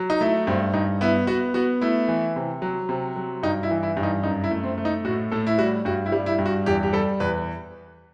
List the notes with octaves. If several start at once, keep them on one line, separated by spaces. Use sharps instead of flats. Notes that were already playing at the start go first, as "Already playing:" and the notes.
Already playing: F#3
D#4
A3 E4
G2 C4
G2 D#4
B3 E4
B3 F#4
B3 F#4
A3 E4
E3
C3
F#3
C3
F#3
G2 D#4
E4
E3
E4
G2
D#4
F#2 D#4
E4
A3
C4
A3
D#4
A2 F#4
A2 A4
E4
G3 F#4
G2 F#4
E4
G3
E4
G2
F#4
E2 G4
G4
G3 A4
E2 B4